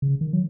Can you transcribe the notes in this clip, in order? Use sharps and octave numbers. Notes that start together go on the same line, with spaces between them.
C#3
D#3
F#3